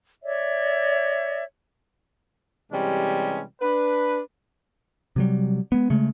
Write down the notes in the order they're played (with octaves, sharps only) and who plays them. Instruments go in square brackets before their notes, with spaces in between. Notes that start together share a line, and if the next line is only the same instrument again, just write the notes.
[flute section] C#5 D5 E5
[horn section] C3 E3 G3 G#3 C#4
D4 B4
[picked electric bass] C3 F#3 G3
G#3 B3
C#3 G#3 A3